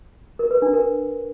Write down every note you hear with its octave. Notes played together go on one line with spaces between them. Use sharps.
A#4
B4
D4
A#4